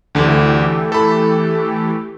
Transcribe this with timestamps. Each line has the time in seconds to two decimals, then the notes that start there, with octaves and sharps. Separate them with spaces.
0.15 D2 D3 E3 A3 G4
0.92 A4 B5